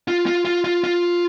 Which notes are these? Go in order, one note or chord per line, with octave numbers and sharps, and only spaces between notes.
F4
F4
F4
F4
F4